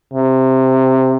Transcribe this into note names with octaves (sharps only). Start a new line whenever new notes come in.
C3